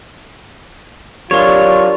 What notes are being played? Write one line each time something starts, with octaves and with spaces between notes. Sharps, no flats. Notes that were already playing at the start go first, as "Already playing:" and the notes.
F#3 D4 F4 G4 A#4 C#5 D5